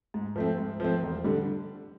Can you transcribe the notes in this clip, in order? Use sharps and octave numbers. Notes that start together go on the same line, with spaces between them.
G#2
F3 A3 C4
G#2
F3 A3 C4
E1
D3 G3